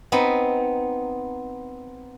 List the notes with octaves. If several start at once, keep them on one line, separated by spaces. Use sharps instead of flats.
B3 C4 D#4 B5